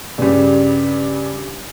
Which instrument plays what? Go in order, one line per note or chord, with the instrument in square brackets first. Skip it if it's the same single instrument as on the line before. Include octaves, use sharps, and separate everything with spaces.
[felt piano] G2 C#3 G3